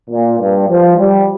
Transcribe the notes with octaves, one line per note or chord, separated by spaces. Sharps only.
A#2
G2
F3
G3